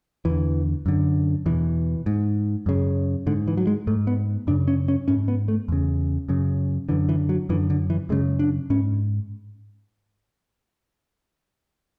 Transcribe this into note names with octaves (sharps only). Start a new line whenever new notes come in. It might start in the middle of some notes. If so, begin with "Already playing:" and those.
E2 D3 E3
F#2 D3
E2 B2 E3
G#2
F#2 C#3
G#2 D3
E3
F#3
G#3
G#2 A3
B3
F#2 C#3 D4
C#4
C#4
G#2 C#4
B3
A3
E2 C#3
F#2 C#3
F#2 D3 E3
E3
F#3
F#2 D3 E3
D3
E3
F#2 C#3 G#3
D4
G#2 C#4